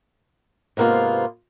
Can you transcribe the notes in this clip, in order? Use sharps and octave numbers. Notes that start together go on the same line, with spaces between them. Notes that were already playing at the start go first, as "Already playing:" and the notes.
G#2 C3 A#3 B3 F4